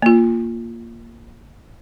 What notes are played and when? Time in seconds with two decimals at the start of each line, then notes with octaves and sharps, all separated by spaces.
0.02 A#3 F4